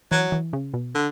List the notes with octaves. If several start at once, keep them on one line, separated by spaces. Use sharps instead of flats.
E3 F#3
E3
C#3
B2
D3